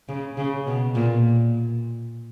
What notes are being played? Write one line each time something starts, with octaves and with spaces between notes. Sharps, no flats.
C#3
C#3
B2
A#2